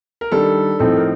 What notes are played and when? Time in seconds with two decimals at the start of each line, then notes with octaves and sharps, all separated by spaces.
0.21 A#4
0.32 D#3 G3 D4 A4
0.79 A2 F3 C4 D#4 A4
0.96 A#4